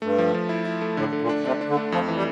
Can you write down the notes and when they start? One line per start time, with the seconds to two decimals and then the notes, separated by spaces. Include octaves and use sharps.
0.02 G2 A3
0.18 F3
0.34 F3
0.49 E4
0.65 E4
0.82 A3
0.97 A2 D3
1.13 D3
1.21 A#2
1.29 D4
1.45 C3 D4
1.61 D4
1.69 D3
1.77 A3
1.92 F2 F3
2.08 E3
2.16 G3